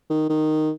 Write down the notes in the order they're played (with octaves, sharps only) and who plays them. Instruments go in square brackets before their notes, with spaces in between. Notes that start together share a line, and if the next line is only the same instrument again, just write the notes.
[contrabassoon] D#3
D#3